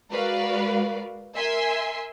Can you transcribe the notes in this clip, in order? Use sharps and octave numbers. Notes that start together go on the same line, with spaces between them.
G#3 F#4 A#4 B4 D5 F5
A#4 E5 G#5 C6